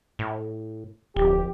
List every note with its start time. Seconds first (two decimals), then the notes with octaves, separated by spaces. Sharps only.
0.19 A2
1.16 D1 F2 G4